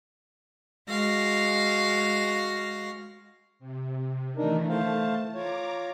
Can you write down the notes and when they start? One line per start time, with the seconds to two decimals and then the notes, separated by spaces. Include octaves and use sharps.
0.88 G#3 F#4 F5 A#6
3.59 C3
4.37 D#3 E3 A3 D4 D#4 A#4
4.69 A3 C5 F5 A5
5.35 F4 C#5 A#5 D6